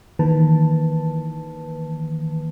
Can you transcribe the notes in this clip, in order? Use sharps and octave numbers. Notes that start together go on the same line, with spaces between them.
D#3 E3 A#3 B4 A5